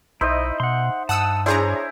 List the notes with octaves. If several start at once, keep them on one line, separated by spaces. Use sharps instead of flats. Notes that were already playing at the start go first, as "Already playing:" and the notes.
B1 D#4 E4 C5 D#5 E5
B2 F#5 C6
G2 F#5 A5 D#6 E6
D4 E4 G#4 C5 C#5 G#5 A#5